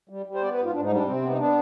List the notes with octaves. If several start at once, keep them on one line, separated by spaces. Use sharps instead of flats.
G3
G3
C5
B3 D5
B4
G#2
F4
G#2 D4
D#4
G3
D4
C3 C4
B3
D#4
B3 D4